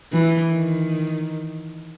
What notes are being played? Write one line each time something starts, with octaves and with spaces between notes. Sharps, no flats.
E3
D#3